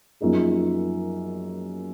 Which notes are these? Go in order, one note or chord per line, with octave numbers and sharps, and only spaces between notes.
F#2 F3 A#3 D#4 G#4